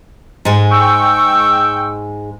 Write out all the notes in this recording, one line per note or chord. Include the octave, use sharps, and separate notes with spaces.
G#2 G#3
G5 C#6 E6